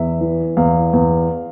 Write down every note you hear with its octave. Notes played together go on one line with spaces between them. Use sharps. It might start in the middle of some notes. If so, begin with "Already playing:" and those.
Already playing: E2 E5
E3
E2 F5
E2